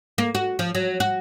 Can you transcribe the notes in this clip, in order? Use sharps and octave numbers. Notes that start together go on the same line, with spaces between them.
A#3
F#4
F3
F#3
F#4